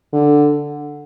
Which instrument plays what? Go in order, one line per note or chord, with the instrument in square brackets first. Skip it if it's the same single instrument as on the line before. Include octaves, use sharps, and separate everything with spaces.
[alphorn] D3